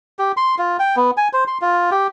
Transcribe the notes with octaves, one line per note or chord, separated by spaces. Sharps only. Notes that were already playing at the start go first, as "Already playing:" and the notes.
G4
C6
F4
G5
B3
G#5
C5
C6
F4
G4